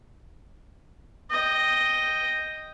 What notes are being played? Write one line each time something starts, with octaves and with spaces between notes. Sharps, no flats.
D#5 G5